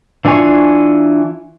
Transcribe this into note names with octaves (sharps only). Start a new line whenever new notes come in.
E3 D4 F4 G#5 C#6